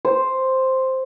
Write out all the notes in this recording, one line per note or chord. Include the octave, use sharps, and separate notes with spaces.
C5